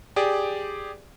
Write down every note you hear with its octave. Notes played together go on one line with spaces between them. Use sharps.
G4 G#4 D5